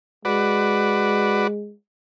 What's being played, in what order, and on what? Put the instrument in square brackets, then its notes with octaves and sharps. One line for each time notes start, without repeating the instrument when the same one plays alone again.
[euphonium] G#3 [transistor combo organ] F#4 B4 D5